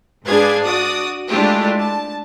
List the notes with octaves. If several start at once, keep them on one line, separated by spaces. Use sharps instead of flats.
G#2 D4 G#4 B4 F5 G#6
F#4 D5 D#6
G#3 A3 D4 E4 F4 G4
A5